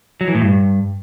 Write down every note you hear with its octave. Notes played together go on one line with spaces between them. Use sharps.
F#3
E3
A2
G2